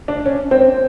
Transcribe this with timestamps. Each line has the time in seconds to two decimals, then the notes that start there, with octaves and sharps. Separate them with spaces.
0.08 D4
0.26 C#4
0.51 C4